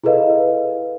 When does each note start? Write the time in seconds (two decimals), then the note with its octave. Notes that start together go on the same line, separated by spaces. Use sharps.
0.04 E4 G#4 A4 B4 D#5 F5